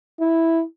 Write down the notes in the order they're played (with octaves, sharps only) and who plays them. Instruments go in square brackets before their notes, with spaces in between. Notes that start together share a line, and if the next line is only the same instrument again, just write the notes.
[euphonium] E4